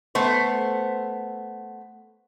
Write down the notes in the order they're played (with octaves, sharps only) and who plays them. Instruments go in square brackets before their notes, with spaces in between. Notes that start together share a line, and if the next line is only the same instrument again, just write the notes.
[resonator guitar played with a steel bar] A3 B3 C5